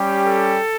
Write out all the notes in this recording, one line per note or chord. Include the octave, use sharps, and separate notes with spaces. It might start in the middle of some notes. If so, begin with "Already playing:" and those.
Already playing: G3 C#4 G4
A4